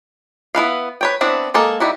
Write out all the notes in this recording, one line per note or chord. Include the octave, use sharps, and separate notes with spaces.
B3 E4 B4 F5
B4 C#5 G5
B3 C4 D4 E4
G#3 A#3 A4
D#3 G3 E4 F#4